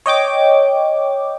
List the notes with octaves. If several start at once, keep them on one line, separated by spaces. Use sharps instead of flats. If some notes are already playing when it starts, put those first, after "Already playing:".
C#5 D#5 G5 D6